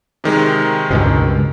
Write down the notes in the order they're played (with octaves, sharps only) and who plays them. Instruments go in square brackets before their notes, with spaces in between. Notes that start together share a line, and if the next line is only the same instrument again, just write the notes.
[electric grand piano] C3 D#3 G#3
[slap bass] C#2 G2 B2